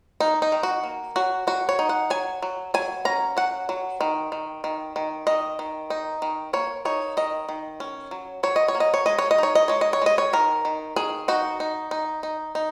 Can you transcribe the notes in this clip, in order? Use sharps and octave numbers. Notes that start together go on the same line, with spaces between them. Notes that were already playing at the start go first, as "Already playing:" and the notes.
A#3 D#4
D#4
D#3
F#4
A#3
F#3 F#4
F#3 F#4
C#5
D#4
F#5
F#3 G#5
F#3
F#3 G#5
C#4 A#5
F#3 F#5
F#3
D#3
D#3
D#3
D#3
D#3 D#5
D#3
D#4
D#3
A#3 C#5
D#4 C#5
D#3 D#5
D#3
C#4
F#3
F#3 C#5
D#5
C#5
A#3
D#5
C#5
G#3 D#5
C#5
D#5
D#4 C#5
D#5
G#3 C#5
D#5
C#5
G#3 D#5
C#5
D#3 A#4
D#3
D#3 G#4
D#4 F#4
D#4
D#4
D#4
D#4